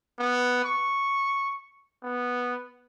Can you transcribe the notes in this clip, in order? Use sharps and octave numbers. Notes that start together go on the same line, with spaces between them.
B3
C#6
B3